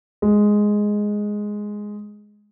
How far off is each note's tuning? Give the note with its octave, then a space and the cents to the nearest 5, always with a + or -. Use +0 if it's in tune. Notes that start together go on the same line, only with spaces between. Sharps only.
G#3 +0